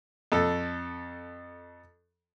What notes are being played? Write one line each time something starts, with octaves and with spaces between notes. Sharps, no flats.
F2 A4